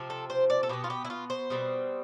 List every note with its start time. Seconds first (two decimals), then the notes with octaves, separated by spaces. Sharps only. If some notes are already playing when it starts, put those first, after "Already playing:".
Already playing: C3 F3 C4
0.10 A4
0.30 C5
0.50 D5
0.63 A4
0.69 B2 B3 G4
0.84 F4
0.90 G4
1.05 E4
1.10 F4
1.30 C5
1.50 B2 G3 C4